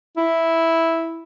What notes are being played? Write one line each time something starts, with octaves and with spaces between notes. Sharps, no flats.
E4